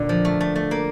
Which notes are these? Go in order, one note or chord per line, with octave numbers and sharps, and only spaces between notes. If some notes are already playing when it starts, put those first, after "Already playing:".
Already playing: A#2 D3
F3
A3
A3
A3
A#3